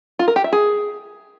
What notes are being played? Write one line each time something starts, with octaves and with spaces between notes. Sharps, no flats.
F4
A#4
G4
E5
G#4